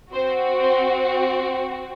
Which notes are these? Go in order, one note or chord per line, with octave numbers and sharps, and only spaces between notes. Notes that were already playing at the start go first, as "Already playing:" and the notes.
C4 F#4 C5
C5